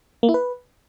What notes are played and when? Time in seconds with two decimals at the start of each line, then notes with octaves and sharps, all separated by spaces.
0.23 A#3
0.29 E4
0.34 B4